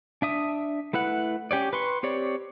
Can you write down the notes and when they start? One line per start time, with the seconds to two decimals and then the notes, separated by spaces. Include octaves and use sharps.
0.22 D4 E5 D#6
0.93 A3 E4 B4 F#5
1.51 C#4 G4 C#5 D5
1.73 B4 C6 C#6
2.03 C4 G4 C#5 D5